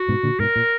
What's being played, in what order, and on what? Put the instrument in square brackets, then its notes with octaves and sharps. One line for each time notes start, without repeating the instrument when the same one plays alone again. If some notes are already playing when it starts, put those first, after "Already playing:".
Already playing: [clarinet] F#4
[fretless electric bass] G#2 B2
A#2 D3
[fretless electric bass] G#2 B2 [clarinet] A#4
[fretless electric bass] A#2